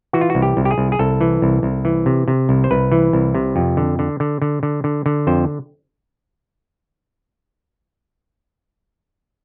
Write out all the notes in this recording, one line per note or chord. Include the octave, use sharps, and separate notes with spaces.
E3 F#4
F4
F#4
C2
G4
C2
G4
G#4
C2
G#4
C2 A4
E3
C2
C2
E3
C3
C3
C2
C5
C2 B4
E3
C2
C3
F2
D3
D3
D3
D3
D3
D3
D3
F2 C5